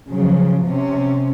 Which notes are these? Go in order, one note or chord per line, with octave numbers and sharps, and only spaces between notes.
C#3 F3 F#3
C3 C#4